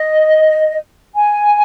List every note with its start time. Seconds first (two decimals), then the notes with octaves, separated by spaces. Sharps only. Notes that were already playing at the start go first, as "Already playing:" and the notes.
Already playing: D#5
1.16 G#5